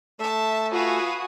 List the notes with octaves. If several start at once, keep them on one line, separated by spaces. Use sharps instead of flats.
A3 A4 E5 A5
F4 F#4 B4 F5 G#5 D#6